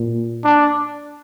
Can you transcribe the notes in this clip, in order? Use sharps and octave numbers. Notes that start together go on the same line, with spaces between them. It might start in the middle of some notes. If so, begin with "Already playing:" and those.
Already playing: A#2
D4